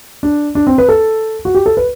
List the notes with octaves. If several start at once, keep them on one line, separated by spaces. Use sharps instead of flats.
D4
D4
C4
B4
A4
F#4
G4
A4
B4